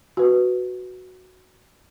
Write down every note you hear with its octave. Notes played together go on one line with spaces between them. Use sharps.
F#4 B4